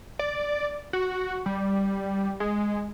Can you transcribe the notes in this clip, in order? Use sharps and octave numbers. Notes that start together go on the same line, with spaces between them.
D5
F#4
G3
G#3